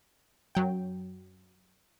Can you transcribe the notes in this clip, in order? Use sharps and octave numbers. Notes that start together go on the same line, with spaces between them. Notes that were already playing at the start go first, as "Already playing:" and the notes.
F#2 F#3 G5